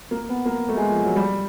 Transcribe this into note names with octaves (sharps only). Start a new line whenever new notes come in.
A#3
B3
A#3
A3
G#3
F3
F#3
G3